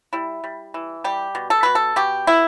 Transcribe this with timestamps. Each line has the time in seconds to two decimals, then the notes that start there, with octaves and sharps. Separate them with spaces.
0.13 G3 E4
0.44 G3
0.74 E3
1.04 G3 G4
1.35 B2
1.50 A4
1.63 B2 B4
1.75 A4
1.96 B2 G4
2.27 B3 E4